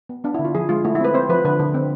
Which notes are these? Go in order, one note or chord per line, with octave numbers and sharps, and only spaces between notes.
B3
B3 D4
E4
D3
F4
F3 G#4
G#3 F4
A3 E4
E4
C4 B4
C4 C5
F3 B4
D3 B4
D3
C4